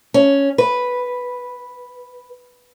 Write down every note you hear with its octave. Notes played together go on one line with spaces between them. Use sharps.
C#4
B4